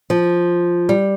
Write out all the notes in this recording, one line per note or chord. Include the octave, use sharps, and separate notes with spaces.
F3
G3